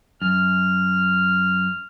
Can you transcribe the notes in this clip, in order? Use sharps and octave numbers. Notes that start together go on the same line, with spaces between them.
F#2 F6